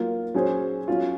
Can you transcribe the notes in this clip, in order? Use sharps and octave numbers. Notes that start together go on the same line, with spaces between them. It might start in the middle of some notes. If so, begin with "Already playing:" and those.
Already playing: F#3 A#3 F4 A#4
F#3 C#4 G#4 C5
F#3 C#4 F4